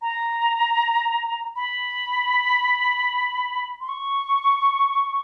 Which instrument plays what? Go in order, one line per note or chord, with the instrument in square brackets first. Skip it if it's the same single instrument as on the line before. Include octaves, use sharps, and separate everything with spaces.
[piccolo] A#5
B5
C6
C#6